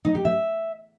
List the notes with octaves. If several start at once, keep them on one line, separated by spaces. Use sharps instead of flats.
D#4
G4
E5